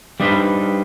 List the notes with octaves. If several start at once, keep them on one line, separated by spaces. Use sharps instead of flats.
G3 D4 D#4 B4 C5